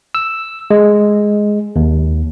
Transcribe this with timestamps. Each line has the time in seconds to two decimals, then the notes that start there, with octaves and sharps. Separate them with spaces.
0.15 E6
0.71 G#3
1.76 D#2